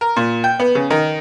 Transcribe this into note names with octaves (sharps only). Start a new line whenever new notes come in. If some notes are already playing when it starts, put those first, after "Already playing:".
A#4
A#2
G5
B3
C#3
D#3